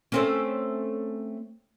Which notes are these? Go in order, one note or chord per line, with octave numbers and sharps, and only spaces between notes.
A3 C4 C#4